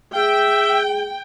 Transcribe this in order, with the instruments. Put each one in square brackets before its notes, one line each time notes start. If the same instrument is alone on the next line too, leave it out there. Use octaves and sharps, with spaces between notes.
[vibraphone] G#4 [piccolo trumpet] E5 [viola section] G5